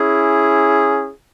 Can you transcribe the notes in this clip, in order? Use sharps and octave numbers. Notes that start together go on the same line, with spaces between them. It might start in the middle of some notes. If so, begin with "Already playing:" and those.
Already playing: C#4 E4 G#4